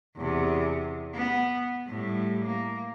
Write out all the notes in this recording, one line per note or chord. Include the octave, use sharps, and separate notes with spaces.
E2 C3
B3
A2 G3
A#3